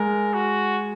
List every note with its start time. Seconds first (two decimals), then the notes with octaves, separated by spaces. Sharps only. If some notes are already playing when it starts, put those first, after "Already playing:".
Already playing: G#3 A#4
0.33 F#4